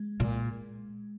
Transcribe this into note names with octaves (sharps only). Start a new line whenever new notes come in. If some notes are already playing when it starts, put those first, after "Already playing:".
Already playing: G#3
A#2